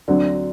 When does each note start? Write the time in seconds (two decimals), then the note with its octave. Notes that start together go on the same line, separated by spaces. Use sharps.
0.08 D2 D3 F#3 C4 D5